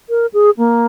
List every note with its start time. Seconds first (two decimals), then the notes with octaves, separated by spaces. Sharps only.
0.09 A#4
0.33 G#4
0.58 A#3